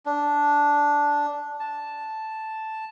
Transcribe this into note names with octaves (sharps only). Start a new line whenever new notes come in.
D4
A5